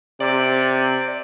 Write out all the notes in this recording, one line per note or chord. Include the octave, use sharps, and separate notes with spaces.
C3 D5